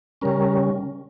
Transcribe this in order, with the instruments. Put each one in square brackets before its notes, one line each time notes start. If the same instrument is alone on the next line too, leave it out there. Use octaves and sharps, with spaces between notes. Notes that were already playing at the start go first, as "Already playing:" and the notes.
[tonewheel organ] C#3 G3 C#4 A#4